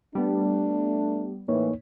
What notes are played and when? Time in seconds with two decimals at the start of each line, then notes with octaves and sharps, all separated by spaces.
0.15 G3 A3 B3 D4
1.48 A2 E3 A#3 D#4 C#5